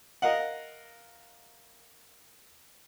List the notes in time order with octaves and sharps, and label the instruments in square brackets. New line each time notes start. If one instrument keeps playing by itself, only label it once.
[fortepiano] A#4 D#5 F5 F#5